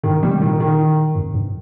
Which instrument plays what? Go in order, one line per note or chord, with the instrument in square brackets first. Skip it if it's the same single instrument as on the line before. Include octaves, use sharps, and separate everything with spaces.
[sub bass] G2 [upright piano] D#3
[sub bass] A#2 [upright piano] G3
[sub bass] A#2 [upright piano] D#3
[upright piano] D#3
[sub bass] F2
G2